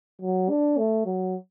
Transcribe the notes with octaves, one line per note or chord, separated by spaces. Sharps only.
F#3
D4
A3
F#3